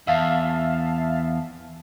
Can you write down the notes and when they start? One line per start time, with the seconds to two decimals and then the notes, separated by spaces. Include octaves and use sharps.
0.07 E2 E5 F5 A5